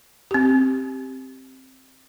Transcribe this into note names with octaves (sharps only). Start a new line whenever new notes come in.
C4 G4